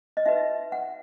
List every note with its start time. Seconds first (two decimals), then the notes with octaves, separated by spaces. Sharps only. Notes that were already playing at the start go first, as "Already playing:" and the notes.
0.17 D#5
0.26 D#4 F#4 B4 E5
0.72 F#5